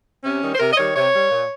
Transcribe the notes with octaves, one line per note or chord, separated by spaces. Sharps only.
C3 C#4
D#3 G3
C5
C3 A#4
D#5
D#3 G3 C#5
C3 C#5
G3
A#2